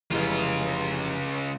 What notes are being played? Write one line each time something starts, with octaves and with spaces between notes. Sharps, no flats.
F1 C#2 E3 G#3 F4